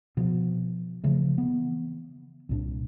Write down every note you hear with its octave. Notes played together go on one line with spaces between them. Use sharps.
B2 F3
C#3 E3 F3 A3
E3 B3
C2 A#2 D4